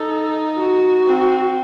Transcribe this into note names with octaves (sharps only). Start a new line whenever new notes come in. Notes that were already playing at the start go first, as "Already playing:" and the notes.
Already playing: D#4 A4
F#4
C4